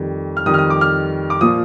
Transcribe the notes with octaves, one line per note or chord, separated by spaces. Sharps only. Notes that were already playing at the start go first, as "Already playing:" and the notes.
Already playing: F2 D#3 G3
F6
F2 D#3 G3 D#6
F6
D#6
D6
F6
D6
A#2 F3 D#6